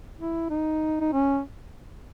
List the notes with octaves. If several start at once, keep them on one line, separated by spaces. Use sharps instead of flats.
E4
D#4
D#4
C#4